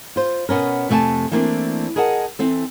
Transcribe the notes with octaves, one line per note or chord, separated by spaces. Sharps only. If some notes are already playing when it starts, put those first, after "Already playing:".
F4 C5
B2 B3 C#4 A#4
F2 C3 A3 E5 G#5 A5
E3 A3 A#3 C4 D4
G#4 A#4 D#5 F#5 A5
E3 C4 A4